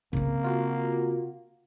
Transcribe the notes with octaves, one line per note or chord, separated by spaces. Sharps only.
C#3 A#3 C4
F4 F#4